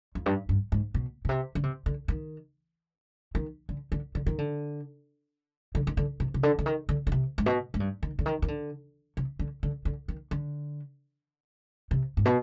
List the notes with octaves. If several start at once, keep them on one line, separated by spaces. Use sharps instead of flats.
F2
G2
G2
G#2
B2
B2
C3
D3
C3
D3
D#3
D#3
D3
D3
D3
D#3
D3
D3
D#3
D3
C3
C3
D3
D3
D#3
D3
D3
C3
G#2
B2
G#2
G2
D#3
D3
D#3
D#3
D3
C3
D3
D3
D3
D#3
D3
C3
G#2
B2